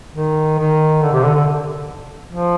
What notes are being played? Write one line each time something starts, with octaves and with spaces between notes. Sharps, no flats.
D#3
D#3
D3
C3
D3
D3
F3